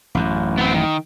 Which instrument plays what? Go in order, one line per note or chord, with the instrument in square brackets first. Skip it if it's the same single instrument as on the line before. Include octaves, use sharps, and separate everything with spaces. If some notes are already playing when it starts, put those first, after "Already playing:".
[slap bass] A1 F#2
[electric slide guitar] B3 C4
D#3